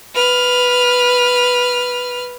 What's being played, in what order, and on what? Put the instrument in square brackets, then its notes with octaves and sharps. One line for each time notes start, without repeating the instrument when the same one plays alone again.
[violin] B4 F6